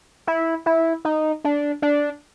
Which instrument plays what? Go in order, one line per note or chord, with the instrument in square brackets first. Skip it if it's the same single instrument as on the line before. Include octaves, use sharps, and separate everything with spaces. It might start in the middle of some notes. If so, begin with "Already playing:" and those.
[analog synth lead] E4
E4
D#4
D4
D4